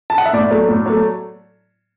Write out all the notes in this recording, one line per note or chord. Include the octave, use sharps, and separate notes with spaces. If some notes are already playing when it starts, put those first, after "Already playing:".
A5
F#5
E5
A2 D5
F#3 A3
A2
F#3 A3